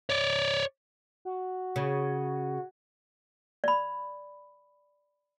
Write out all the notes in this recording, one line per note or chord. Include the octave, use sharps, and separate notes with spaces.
C#5 D5
F#4
C#3
D5 B5